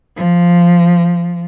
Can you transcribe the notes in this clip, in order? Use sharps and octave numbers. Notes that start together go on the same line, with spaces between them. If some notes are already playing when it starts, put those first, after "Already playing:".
F3